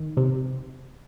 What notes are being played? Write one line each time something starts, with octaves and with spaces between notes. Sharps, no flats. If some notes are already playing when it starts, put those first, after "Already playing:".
Already playing: D#3
C3